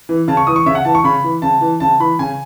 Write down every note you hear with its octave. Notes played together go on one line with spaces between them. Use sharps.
E3
C#3 A5
C#6
E3 D#6
C#6
C#3 E5
F#5
E3 A5
C#6
C#3 B5
E3
C#3 A5
E3
C#3 A5
E3 B5
C#3 G#5